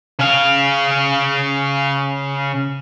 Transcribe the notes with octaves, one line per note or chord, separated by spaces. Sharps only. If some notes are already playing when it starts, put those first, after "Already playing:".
C#3 F5